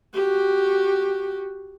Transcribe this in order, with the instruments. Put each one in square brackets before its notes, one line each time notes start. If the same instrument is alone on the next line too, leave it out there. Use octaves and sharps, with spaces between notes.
[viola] F#4 G4